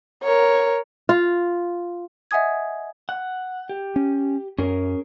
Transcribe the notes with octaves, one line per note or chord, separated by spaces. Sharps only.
A#4 C#5
F4
D#5 E5 F#5 G#5 D#6 G#6
F#5
G4
C#4
F#2 C#4 G#4 A#4